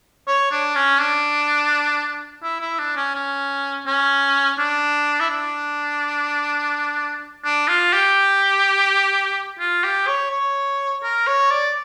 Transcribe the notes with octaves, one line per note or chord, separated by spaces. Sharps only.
C#5
D4
C#4
D4
E4
E4
D4
C#4
C#4
C#4
D4
E4
D4
D4
F4
G4
F4
G4
C#5
C#5
A#4
C#5
D5